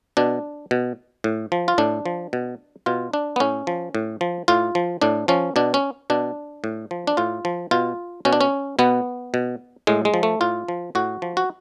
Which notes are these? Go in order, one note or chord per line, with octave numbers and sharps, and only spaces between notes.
B2 D4
B2
A2
F3
F4
A2 D4
F3
B2
B2 F4
D4
B3
A2 C#4
F3
A2
F3
A2 F4
F3
A2 D4
F3 C#4
B2 D4
C#4
B2 D4
A2
F3
D4
A2 F4
F3
B2 F4
B2 C#4
D4
C#4
B2 B3
B2
A2 G#3
G#3
F3
A3
A2 F4
F3
A2 F#4
F3
F#4